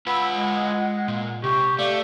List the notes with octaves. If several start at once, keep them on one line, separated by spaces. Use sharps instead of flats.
F4 B4 F#5 B5 E6
G#3
A#2
C3 G4 C#6
A3 D5 F5